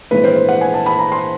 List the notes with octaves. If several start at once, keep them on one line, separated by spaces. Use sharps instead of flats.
A#1 G#2 E3 A3 C4 B4
C5
C5
F#5
G#5
A5
B5
A#5
C6